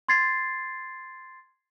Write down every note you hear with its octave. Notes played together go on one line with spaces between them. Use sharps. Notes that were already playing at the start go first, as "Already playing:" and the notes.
C6 G#6 A6 C7